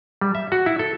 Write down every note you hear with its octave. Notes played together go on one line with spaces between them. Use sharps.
G3
E5
F#4
E4
A4